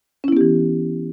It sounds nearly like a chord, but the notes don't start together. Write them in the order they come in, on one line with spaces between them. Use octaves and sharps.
C#4 E4 B3 G4 E3